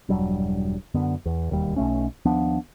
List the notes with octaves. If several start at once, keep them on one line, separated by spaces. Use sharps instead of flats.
E1 G2 F#3 G3
F#2 D3 B3
E2
E1 D#2 G3
B1 A2 A3 C#4
D#2 F3 B3 D4